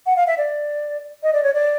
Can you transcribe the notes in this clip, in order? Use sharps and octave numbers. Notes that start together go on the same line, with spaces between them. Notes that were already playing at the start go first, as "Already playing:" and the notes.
F#5
F5
E5
D5
D#5
D5
C#5
D5